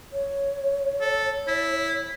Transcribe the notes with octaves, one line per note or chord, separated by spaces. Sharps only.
C#5
A4
E4